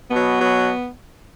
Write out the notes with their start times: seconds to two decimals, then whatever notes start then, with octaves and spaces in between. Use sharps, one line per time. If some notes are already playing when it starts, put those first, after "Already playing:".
0.10 B2 F#3 B3
0.39 B2 F#3